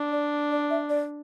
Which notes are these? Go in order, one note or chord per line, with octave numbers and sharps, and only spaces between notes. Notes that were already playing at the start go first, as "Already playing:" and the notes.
Already playing: D4
D5
D5
E5
D5